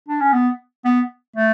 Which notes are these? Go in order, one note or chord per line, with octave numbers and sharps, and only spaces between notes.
D4
C#4
B3
B3
A3